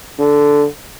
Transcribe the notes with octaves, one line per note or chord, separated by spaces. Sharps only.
D3